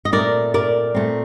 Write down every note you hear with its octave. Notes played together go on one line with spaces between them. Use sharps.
D#5
A#2 A3 C4 A#4 D5
A#4 D5
A#2 A3 C4